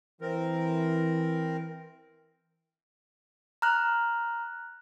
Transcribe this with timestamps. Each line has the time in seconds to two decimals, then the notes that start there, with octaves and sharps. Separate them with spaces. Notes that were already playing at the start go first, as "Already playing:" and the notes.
0.22 E3 C4 A#4
3.62 A#5 F6 F#6